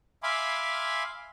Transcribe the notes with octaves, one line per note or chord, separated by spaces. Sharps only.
E5 F5 G#5 B5 C6 D6